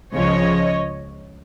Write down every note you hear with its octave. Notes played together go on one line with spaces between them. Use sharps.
C#2 C#3 F3 C#5 D#5